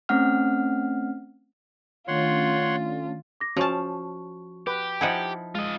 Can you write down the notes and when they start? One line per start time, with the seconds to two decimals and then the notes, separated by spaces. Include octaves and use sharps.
0.09 A3 C4 C#4 F#5 F6
2.08 D#3 A3 C#4 D4 F4 C#5 F#5 C6
3.41 D6 A#6
3.57 F3 C#4 F#4 A5 C#6
4.67 G4 B4
5.01 F3 D#4 E4 F#5 G#5
5.55 G#3 F4 D#5